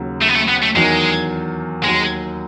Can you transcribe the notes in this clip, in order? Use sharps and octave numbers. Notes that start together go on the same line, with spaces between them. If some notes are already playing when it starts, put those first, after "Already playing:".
Already playing: D#2 C#3 F#3
A3
B3
A3
B3
A3
E2 D#3 F#3 G#3
D#2 D#3 F#3 G#3